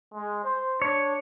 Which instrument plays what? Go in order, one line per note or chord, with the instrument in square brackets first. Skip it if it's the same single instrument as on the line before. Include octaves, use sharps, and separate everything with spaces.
[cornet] G#3
C5
[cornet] D4 [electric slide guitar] C#5